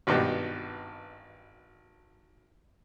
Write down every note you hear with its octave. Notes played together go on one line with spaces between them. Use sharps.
G#1 G2 B2 G4